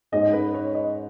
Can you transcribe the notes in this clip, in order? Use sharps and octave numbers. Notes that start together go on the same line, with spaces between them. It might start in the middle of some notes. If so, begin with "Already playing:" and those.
G#2 G#3 C#4 D#5
B4
C#5
D#5